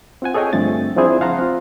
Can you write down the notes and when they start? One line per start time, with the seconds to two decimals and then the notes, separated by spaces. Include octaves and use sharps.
0.22 C4 F4 F#5 G#5
0.34 G#4 A4 C#5 D#5 G5
0.53 G2 D3 F3 A3 C4 A6
0.97 F3 C4 D4 E4 G#4 C5
1.21 C#2 F5 F#5 A5 A#5 C6
1.39 C4 F4